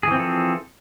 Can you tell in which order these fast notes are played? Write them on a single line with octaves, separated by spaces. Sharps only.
G#4 E3 C4 F3 A4